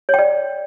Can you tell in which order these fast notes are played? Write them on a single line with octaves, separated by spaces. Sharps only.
C#5 G5 D5